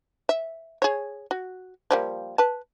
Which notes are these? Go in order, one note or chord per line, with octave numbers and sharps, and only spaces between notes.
E5
G#4 C#5
F#4
F3 G3 A#3
B4 A5